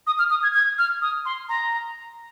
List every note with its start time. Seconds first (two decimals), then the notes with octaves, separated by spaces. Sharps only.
0.07 D#6
0.19 F6
0.30 D#6
0.43 G#6
0.54 G#6
0.78 F6
1.02 D#6
1.25 C6
1.49 A#5